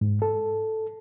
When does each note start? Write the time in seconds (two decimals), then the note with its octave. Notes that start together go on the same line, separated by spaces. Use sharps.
0.01 G#2
0.22 A4